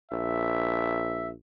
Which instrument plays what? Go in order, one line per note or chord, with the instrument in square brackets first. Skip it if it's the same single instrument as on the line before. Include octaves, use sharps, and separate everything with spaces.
[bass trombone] A#1 [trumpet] E5